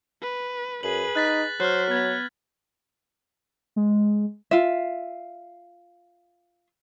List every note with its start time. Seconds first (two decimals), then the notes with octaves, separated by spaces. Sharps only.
0.22 B4
0.83 F#2 G#4 B4 F#7
1.15 D#4 F#6 A6 B6
1.60 F#3 C5 F6 F#6
1.91 B3 G#6
3.76 G#3
4.51 F4 E5